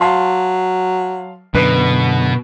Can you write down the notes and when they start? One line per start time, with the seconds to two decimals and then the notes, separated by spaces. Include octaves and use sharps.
0.01 F#3 F5 A5 C6
1.54 F#2 B2 D3 B4